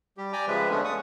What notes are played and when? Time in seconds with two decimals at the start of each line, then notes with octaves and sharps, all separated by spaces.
0.18 G3 G4
0.33 D5 G5 G#5 A#5 D6
0.48 C#3 F3 G#3 B4 E5
0.70 D3 G#3 A3 B3 C#4 D4
0.84 C#6 D#6